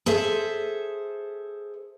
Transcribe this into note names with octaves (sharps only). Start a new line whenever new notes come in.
G#4 A4 C5 E5